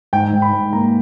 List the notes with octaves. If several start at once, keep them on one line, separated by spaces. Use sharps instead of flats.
G#2 G5
G#2
B5
G#2
A#3 A#5